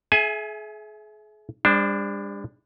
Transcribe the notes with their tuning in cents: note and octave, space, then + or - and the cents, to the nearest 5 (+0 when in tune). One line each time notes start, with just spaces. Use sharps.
G#4 +40 E5 +0 G#5 +5
G3 +45 D4 +0 C5 +0